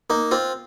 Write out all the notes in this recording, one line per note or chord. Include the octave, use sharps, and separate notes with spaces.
A#3 D#4
C4 F4